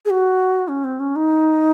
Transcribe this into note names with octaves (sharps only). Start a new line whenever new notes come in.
G#4
F#4
C#4
C4
C#4
D#4